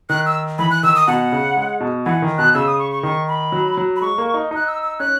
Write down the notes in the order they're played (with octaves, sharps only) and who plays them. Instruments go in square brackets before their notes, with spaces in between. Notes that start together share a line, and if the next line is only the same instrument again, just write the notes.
[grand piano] D#3 [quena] F#6
[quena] E6
[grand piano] E3 [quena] B5
[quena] F#6
[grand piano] D#3 [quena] E6
[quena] D#6
[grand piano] B2 [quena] F#5
[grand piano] C#3
G#3
B2
[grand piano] E3 [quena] F#5
[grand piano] D#3
[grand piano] B2 [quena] F#6
[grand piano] C#3 [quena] E6
[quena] D#6
C#6
C#6
[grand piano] D#3 [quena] C#6
[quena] B5
[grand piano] F#3
F#3
[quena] B5
[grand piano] G#3 [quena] C#6
[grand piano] A#3
D#4
[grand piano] D#4 [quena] F#6
[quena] E6
E6
[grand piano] C#4 [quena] F#6